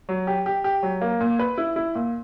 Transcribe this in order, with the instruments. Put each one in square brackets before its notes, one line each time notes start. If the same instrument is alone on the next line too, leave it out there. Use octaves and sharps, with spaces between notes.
[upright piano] F#3
G4
G4
G4
F#3
A#3
A#2
B4
E4
E4
A#2